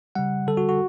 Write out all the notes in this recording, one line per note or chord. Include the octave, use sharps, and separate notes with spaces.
C#3 G3 F#5
D3 G3 A4
F#4
F#4